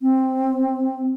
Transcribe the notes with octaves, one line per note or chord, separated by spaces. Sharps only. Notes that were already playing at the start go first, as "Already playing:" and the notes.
C4